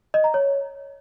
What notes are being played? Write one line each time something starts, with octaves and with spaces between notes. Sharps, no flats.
D#5
A#5
C#5